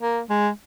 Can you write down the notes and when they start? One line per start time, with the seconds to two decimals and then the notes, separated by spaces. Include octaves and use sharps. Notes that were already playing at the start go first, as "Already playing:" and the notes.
0.01 A#3
0.29 G#3